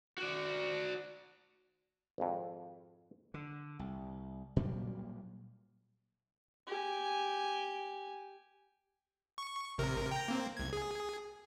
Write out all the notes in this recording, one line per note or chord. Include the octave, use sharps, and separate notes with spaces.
F#4 D5
G#1 F2
D3
C2
A#2 F#3 G3 A#3
G4 G#5
C#6
A1 C3 A#4
G5 A#5
A#3 C4
C2 G#6
G#4